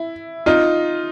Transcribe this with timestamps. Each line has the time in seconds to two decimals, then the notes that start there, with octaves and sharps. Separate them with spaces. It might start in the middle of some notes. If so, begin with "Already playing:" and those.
Already playing: E4
0.46 D#4 F4